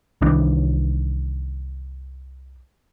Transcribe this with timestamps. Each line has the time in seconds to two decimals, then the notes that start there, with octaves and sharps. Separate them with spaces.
0.22 C2 D#3 E3 D4